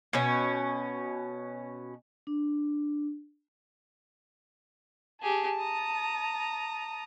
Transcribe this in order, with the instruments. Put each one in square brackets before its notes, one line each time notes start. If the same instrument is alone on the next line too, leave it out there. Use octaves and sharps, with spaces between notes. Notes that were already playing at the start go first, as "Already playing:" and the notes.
[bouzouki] B2 C#4
[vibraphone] D4
[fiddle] G4 G#4 [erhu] A5
[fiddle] A#5 D#6